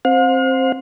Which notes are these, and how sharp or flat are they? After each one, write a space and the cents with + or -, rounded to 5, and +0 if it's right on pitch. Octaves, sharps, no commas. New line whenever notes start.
C4 +20 C5 +0 F5 +45